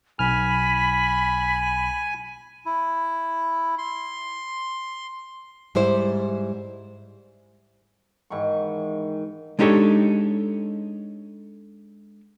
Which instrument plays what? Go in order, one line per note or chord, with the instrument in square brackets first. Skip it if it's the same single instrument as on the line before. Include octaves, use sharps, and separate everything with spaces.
[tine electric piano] B1 F6 [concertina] G#5 [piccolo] B5
[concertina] E4
C6
[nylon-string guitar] G#2 G3 E4 C5
[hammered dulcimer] G#2 D#3 E3 C#6
[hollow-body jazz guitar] G#3 D4 D#4 G4 A4 C#5